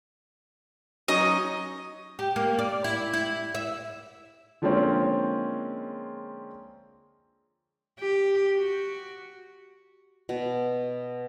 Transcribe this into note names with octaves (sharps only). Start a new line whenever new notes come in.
F#3 C#4 D#4 D#5
G4
A#3
D5
E4
E4
E5
D3 F3 G#3 A#3 C4 C#4
G4
F#4
B2